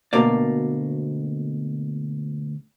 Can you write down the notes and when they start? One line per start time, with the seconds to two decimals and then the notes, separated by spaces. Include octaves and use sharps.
0.13 D2 B2 A#3 D5